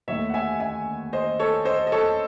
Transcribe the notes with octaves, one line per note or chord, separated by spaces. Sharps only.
D#2 D#3 A3 C#5 E5
F#5
E5 G#5
E5 G#5
C5 D#5
A4 C#5
C5 D#5
D#5
A4 C#5